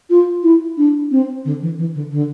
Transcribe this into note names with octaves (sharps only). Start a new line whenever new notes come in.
F4
E4
D4
C4
D3
E3
E3
D3
D3